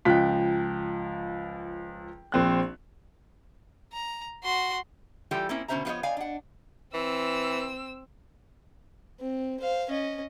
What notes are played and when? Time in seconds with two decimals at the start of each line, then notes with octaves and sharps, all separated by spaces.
0.05 C#2 F3 G5 F#6 B6
2.32 A#1 C4 F#6
3.93 A#5
4.44 F#4 C6
5.31 E3 G3 F4 G4 A4 G5
5.49 A#3 C4 C#4 E4
5.68 B2 D3 C#4 C5 E5 A#5
5.85 F3 B3 D#4 F4 C#5 D#5
6.03 D5 D#5 F5 G#5
6.17 D4 F#5
6.94 E3 C4 E6
9.21 C4
9.60 C5 F5
9.90 C#4 D#5